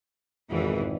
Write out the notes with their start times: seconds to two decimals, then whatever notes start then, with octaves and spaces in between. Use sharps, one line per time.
0.50 G#1 F2 B2 E3